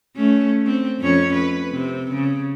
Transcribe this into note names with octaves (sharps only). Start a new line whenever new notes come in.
A3 C#4
C4
F2 C#4 C#5
B4
C3 C4
C#3